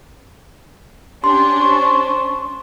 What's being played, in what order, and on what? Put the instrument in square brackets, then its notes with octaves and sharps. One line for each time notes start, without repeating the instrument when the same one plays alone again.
[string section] C#4 D4 [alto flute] G4 [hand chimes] C6
[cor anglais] C5 [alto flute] C#6